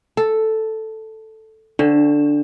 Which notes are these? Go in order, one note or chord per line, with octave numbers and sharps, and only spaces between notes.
A4
D3 D4